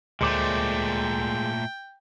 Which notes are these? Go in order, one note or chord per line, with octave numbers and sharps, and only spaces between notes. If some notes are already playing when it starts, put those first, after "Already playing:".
D2 A#2 G#3 A3 C5 D5 G5 D6